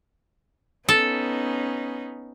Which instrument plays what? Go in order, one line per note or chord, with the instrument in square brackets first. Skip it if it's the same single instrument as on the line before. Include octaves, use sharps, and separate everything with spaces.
[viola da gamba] B3 C#4 D#4 [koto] A4